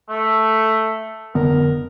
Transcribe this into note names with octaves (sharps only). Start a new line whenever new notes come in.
A3
F1 D3 B3 A#4